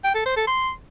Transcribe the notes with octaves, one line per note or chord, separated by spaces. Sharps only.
G5
A4
C5
A4
C6